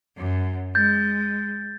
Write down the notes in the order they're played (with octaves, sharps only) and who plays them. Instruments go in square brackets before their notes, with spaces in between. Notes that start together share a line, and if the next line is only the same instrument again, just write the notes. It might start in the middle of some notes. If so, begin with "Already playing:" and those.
[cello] F#2
[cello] G#3 [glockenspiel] G6 A6